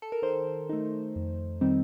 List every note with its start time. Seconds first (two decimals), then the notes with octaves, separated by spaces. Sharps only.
0.02 A4
0.12 A#4
0.22 D#3 C5
0.69 A3 D#4
1.16 F2
1.61 D#3 G3 C4 D#4